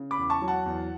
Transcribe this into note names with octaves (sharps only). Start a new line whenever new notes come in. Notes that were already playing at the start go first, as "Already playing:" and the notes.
Already playing: C#3
B5 D6
E2
A5 C#6
F#3
F#5 A5
E2